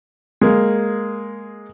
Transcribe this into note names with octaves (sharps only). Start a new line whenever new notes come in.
G#3 A#3